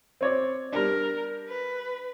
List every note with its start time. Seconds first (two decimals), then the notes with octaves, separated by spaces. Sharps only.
0.21 C4 C#5 D5
0.73 G3 D4 A#4
1.49 B4